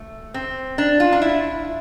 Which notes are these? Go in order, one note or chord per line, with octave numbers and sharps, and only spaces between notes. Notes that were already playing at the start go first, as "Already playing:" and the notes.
Already playing: A3
C4
D4
F4
D4
E4